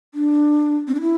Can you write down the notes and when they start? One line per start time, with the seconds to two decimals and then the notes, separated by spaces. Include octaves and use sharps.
0.15 D4
0.88 C4
0.95 D4
1.01 E4